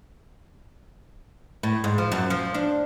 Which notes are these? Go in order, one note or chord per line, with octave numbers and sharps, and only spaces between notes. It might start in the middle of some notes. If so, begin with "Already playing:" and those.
A2
G#2
F3
F#2
F3
D4